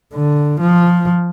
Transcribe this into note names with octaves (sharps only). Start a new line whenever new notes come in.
D3
F3